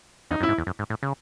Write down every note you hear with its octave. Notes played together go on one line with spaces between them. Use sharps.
E2 D#4
F#2
E4
G#2
E2
F#2
G#2
A2
C#3